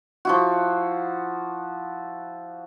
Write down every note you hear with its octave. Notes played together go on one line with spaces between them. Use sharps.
F3 E4 F#4